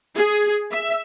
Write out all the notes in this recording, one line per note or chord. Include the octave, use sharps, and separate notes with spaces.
G#4
E5